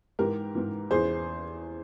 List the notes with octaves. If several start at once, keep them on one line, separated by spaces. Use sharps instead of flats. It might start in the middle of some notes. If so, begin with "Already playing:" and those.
G#2 E3 G4 A#4
G#2 E3
E2 E3 G#4 C5